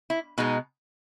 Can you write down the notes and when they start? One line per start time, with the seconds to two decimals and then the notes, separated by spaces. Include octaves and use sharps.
0.10 E4
0.38 B2 G#3 D#4